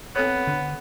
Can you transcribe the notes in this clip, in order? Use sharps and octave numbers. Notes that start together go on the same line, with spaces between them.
B3 C4 A4 C#5
D3